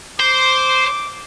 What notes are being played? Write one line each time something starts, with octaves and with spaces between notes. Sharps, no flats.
C5 D6